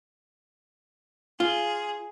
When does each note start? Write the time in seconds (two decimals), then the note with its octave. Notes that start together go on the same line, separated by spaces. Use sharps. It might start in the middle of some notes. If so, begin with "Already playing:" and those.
1.40 F4 G#4